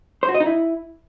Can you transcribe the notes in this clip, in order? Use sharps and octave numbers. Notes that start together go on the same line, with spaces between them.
C5
F#4
D#5
D#4
E4